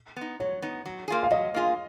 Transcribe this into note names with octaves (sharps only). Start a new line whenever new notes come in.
B3 D#4
F#3 C#5
B3 D#4
F#3
A#3 F4 G#4
F5
F#3 D#5
A#3 F4 G#4